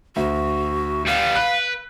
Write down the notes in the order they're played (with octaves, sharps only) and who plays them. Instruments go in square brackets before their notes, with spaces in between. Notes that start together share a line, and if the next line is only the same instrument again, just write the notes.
[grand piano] D2 [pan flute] F#4
[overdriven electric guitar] G3 B3 [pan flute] F5
[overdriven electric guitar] B4 [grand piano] F#6